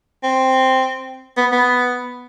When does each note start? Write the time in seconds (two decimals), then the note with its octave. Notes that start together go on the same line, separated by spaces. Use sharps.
0.23 C4
1.37 B3
1.52 B3